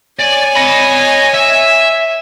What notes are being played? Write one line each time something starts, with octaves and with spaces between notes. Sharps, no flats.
C#5 D5 G#5
D#5 B5
E5